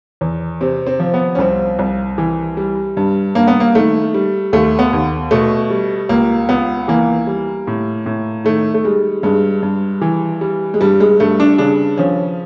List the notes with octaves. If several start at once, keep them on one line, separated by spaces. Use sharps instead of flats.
E2
C3 C4
C4
F3
B3
C#4
C2 C4
C2
E3
G3
G2
G2 A#3
B3
A#3
D#3 A3
G3
D#2 A3
B3
D#2
B2 A3
G3
C#2 A#3
C#2 B3
E3 A#3
G3
A2
A2
D#3 A3
A3
G3 G#3
G2 G#3
G2
E3
G3
G#3
G2 G3
G#3
G2 A3
D4
C#3 D4
F3 C#4